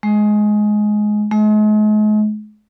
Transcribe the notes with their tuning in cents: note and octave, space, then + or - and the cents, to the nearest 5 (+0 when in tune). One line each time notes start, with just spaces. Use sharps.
G#3 +15
G#3 +40